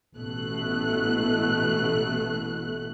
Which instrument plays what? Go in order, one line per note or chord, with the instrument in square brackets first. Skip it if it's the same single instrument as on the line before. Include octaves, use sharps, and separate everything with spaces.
[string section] A1 B2 A3 F#6